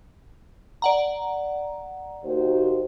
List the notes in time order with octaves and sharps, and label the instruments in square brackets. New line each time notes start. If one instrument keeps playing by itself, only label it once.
[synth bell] D5 F#5 A#5
[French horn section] D#2 F#4 C5